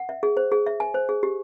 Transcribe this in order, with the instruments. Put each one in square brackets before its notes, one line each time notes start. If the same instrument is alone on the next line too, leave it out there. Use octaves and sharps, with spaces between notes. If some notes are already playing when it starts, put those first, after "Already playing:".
Already playing: [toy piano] F#5
E5
G#4
C5
G#4
E5
G#5
C5
G#4
G4